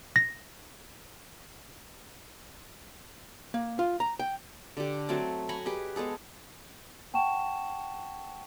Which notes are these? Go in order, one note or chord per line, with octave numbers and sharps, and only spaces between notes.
A#6
A#3
F4
A#5
G5
D3 G4
F#3 A3 C4 A5
G#5 A#5 B5 C#6
G4 G#4 B4 D#5
G#3 B3 G#4 A4
F#5 G5 A5 C#6 E7